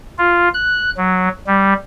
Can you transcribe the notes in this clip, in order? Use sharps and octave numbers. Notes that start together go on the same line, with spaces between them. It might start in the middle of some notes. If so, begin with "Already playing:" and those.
F4
F#6
F#3
G3